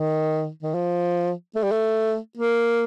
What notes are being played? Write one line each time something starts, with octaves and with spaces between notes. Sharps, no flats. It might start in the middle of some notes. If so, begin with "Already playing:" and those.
Already playing: D#3
D#3
F3
A3
G3
A3
A#3